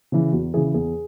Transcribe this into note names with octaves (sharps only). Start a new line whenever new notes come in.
C#3 E3
E2 F#4
C#3 E3 G#4
E2 G#4